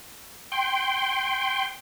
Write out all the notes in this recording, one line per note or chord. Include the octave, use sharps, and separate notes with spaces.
G5 C6